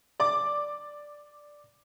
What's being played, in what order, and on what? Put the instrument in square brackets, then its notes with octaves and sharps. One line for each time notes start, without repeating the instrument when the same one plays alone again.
[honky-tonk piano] D5 D6